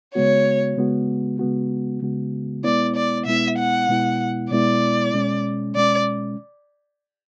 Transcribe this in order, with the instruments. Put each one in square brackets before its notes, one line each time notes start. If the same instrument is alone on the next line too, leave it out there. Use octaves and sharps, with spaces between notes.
[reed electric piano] C#3 G#3 B3 F#4 [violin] C#5
[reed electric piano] C#3 G#3 B3 F#4
C#3 G#3 B3 F#4
C#3 G#3 B3 F#4
[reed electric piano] B2 G#3 B3 E4 [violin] D5
[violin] D5
[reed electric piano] B2 G#3 B3 E4 [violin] E5
[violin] F#5
[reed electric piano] B2 G#3 B3 E4
[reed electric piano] B2 G#3 B3 E4 [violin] D5
[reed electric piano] B2 G#3 C#4
[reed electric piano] B2 G#3 C#4 [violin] D5